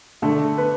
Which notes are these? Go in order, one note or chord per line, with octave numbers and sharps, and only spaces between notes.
D3 A3 A4
B3 B4